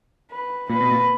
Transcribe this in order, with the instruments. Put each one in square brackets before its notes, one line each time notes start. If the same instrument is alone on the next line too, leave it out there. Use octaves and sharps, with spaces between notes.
[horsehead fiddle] B4
[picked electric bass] A#2 [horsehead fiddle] B4
[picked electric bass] B2
A#2